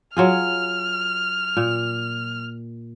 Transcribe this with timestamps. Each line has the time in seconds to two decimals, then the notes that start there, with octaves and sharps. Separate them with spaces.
0.17 F#3 F4 G#4 F6
1.57 A#2